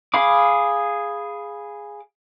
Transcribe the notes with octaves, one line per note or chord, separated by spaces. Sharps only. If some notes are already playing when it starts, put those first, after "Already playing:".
G#4 F5 B5 D6